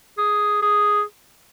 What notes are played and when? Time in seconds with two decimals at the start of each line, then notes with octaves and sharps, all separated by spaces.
0.18 G#4
0.62 G#4